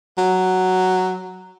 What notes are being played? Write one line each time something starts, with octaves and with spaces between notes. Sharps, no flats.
F#3